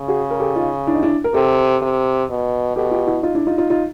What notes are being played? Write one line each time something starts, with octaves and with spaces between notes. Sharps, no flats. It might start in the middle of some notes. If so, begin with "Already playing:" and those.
Already playing: C#3
F#4 G#4
A#4
G4 A4
D#4 F4
D4 E4
D#4
D4 E4
A#4
C3 G4 A4
C3
B2
B2 G4 A4
F4 G4
E4 F#4
D#4 F4
D4 E4
D#4 F4
D#4 F4
D#4 F4